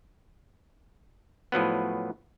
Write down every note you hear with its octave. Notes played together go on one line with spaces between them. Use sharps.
A2 F3 F#3 B3